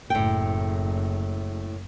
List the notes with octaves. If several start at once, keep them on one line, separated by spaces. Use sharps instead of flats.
F#1 A2 G5